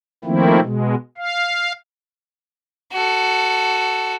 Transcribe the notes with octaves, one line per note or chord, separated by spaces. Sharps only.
D#3 F3 A3 A#3 C4 E4
B2 G#3
F5
F#4 A4